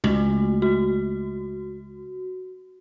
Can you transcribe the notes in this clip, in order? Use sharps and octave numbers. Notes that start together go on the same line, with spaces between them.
C#2 A3 F#4
F#4